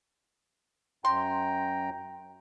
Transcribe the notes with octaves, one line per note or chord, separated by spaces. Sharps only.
F#2 G5 A#5 C6